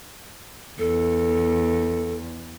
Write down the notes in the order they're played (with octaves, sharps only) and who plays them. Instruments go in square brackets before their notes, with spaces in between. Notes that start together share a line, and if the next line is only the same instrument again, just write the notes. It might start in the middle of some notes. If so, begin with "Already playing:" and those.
[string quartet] E2 [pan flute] A4